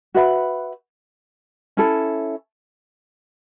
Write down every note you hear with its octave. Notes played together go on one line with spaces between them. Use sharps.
F#4 B4 E5 B5
C#4 E4 A4